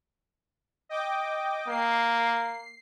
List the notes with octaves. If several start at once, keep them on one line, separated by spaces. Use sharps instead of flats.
D#5 G5 D6
A#3 C7